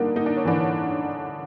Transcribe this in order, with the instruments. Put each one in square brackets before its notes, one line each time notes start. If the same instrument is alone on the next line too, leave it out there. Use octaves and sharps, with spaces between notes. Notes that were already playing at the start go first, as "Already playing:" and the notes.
Already playing: [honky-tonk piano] D3 D4 D#4 [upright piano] G3 A#3
[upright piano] A#3 [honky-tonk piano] D#4
[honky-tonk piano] D4
C#4
[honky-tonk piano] D3 D4 [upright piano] E3